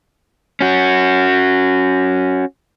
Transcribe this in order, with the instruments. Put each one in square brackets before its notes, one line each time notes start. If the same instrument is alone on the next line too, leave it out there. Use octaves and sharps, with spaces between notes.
[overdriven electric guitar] C#4 F#4